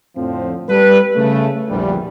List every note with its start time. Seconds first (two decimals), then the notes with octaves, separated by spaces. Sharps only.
0.17 F2 A2 D3 F3 C4
0.69 G3 A4 B4
1.16 C#3 A3
1.69 A#1 E2 D3 G3